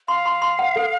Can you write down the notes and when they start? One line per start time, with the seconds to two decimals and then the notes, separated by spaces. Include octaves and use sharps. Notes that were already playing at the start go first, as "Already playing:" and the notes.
0.08 F5 C6
0.26 C6
0.42 C6
0.59 F#5
0.76 A4